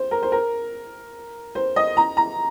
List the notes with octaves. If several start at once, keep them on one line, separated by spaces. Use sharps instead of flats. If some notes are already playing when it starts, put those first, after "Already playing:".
Already playing: C5
A#4
C5
A#4
C5
D#5
A#5
A#5